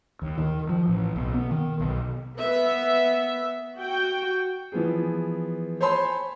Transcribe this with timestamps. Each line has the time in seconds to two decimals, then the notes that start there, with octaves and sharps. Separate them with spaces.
0.22 D#2
0.38 D#3
0.69 F3
0.88 A1
1.16 B1
1.34 B3
1.51 D#3
1.80 B1
2.39 B3 E5
3.77 F#4 G5
4.72 E3 F3 B3 G#4
5.81 C5 C#5 G#5 A5 B5 C6